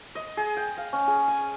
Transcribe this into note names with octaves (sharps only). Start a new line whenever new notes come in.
D#5
G#4
G5
F5
C#4
G#4
G#5